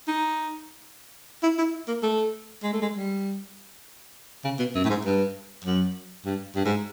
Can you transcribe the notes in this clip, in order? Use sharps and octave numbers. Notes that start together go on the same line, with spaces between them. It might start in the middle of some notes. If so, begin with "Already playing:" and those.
D#4
E4
E4
A#3
A3
G#3
A3
G#3
G3
C#3
B2
F#2
A2
G#2
G2
F#2
G2
G2
G#2